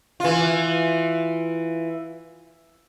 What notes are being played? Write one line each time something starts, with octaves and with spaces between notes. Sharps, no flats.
E3 F4